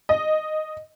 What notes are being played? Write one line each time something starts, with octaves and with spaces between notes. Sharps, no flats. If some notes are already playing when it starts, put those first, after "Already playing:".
D#5